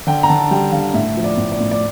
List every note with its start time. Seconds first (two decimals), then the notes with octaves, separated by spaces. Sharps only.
0.07 D3 G5
0.23 A#5
0.29 D3 A5
0.51 G3 G5
0.72 D3 F5
0.94 A2 E5
1.17 F3
1.24 D5
1.38 A2
1.52 D5
1.60 A2
1.71 D5